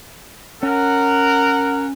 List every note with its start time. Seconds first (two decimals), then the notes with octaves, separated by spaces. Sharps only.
0.63 C#4 A#4 F#5